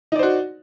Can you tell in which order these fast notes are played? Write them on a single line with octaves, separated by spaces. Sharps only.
D#4 D5 C5 F#4